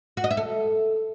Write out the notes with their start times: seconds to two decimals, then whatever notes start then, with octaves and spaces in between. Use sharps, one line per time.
0.17 F#4
0.24 D#5
0.31 E5
0.37 A4